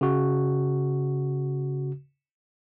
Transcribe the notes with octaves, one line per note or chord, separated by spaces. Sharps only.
C#3 F#4